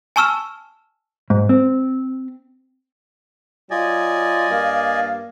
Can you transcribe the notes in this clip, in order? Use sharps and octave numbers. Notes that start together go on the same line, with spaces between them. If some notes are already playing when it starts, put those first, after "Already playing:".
G#5 A5 C#6 E6 F6 E7
G#2
C4
F#3 F4 D5 D#5 G#5
G2 A#3 F5